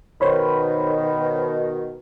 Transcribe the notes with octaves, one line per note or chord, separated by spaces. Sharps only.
B2 D#3 C5 C#5 B5